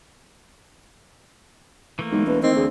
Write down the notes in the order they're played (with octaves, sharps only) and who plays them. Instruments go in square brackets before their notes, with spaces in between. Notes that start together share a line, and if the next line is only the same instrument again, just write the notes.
[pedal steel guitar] E3 A3 A#3
[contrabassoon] B1 [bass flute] G#3
[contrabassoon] E1 [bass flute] B4
[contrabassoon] D#3 [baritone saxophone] C4 [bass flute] D#5
[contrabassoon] D2 [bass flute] G#4